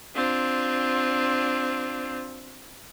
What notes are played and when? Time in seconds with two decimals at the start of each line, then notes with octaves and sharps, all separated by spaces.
0.14 C4 D4 F4